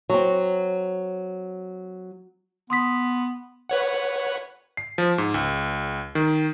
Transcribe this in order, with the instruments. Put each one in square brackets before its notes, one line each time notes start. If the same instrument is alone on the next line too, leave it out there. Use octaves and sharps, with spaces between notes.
[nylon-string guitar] F#3 C4
[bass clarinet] B3 [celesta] C6 D#6 B6
[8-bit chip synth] B4 C#5 F#5
[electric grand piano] C7
F3
G#2
C#2
D#3